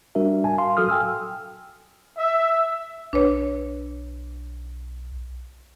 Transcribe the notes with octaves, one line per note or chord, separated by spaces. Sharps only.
G3 D4 F#4 A#4 E5
G#5 A5
F5 C6
F#3 F#4 A4 D#6 F6
G5 G#5 E6 F6
E5
B1 D4 B4 C#5